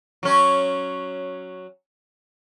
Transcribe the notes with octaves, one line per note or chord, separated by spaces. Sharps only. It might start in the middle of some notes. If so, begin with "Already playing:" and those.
F#3 C#4